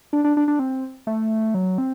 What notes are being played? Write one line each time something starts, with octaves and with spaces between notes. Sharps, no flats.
D4
D4
D4
D4
C4
A3
F#3
C4